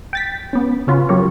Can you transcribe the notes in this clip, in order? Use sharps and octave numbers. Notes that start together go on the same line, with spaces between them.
G5 A6 B6
B3 C#4
C#3 C#4 F4 F#4 B4
F#3 G4 A#4 C#5